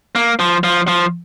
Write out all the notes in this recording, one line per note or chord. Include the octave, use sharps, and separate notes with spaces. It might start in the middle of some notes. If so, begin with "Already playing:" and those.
A#3
F3
F3
F3